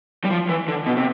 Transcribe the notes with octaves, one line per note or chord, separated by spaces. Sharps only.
G3
F3
E3
D3
B2
C3